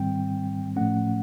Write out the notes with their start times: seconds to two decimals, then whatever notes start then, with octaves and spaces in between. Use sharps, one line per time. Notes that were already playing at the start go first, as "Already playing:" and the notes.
Already playing: G#2 D#3 G3 C4 G5
0.76 A2 F3 A3 C#4 F#5